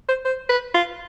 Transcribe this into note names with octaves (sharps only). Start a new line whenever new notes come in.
C5
C5
B4
F4